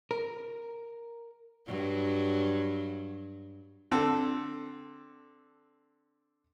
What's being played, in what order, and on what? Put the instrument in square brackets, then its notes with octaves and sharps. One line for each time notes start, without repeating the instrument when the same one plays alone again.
[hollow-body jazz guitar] A#4
[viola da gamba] G2 F#3
[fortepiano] D3 C4 A4